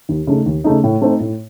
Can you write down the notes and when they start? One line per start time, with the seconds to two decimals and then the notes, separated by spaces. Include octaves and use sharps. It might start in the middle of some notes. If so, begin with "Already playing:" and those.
0.09 D#2
0.27 C#3 A3 D#4
0.46 D#2
0.64 C#3 A3 D#4
0.84 A2
1.02 A3 C4 D#4
1.20 A2